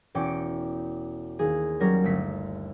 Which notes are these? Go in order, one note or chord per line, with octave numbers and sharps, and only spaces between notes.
E1 C#4 G5 D6 C#7
D#2 G#4
F#3 G3 C#4 A#4
G1 A3 B6 C7